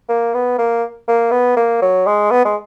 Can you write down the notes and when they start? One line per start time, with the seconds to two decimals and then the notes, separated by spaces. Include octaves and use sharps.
0.09 A#3
0.34 B3
0.58 A#3
1.08 A#3
1.32 B3
1.57 A#3
1.82 F#3
2.06 G#3
2.31 B3
2.45 G#3